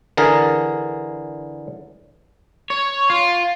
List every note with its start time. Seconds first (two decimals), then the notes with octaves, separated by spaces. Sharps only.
0.17 D3 E3 G#4 A#4
2.70 C#5
3.10 F4